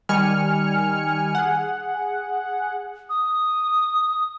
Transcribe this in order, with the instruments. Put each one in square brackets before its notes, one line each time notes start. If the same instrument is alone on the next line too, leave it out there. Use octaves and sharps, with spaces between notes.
[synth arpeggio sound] D#3 G3 G#5 F6 C#7
G#4 F#5
[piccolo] D#6